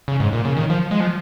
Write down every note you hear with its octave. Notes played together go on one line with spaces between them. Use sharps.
C#3
G#2
A#2
C#3
D#3
F3
G#3
F3